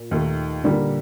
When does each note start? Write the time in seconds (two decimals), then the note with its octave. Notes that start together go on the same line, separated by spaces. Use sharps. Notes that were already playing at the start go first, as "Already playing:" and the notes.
Already playing: A#2
0.11 D#2 D#3 A3
0.64 A#2 D3 G3 A#3